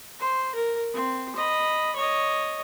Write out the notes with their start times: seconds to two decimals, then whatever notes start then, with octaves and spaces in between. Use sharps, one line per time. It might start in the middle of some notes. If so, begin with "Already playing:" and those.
0.20 C5
0.55 A#4
0.94 C4
1.36 D#5 B5
1.96 C#5 D#5